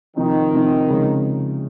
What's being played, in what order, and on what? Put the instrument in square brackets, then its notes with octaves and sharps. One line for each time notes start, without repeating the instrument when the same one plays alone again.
[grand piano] C3 F3 C4 D#4 [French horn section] D#3
[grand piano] C3 F3 C4 D#4
C#3 F3 G#3